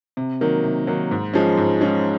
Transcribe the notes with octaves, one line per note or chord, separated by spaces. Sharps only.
C3
D#3 F#3 A#3
C3
D#3 F#3 A#3
G#2
F3 G#3 C#4
G#2
F3 G#3 C#4